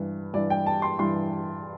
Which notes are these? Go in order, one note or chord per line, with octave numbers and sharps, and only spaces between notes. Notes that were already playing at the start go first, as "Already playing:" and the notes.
Already playing: G2 E3
G2 E3 D5
G5
A5
C6
G2 E3 C6